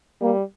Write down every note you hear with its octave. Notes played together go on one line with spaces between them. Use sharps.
G3 A#3